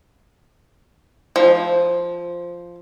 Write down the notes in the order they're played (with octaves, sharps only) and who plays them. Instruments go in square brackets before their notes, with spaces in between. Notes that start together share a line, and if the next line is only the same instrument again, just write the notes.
[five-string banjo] F3